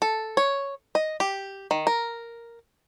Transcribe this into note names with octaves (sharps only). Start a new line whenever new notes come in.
A4
C#5
D#5
G4
D#3
A#4